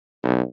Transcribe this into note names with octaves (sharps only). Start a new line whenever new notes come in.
B1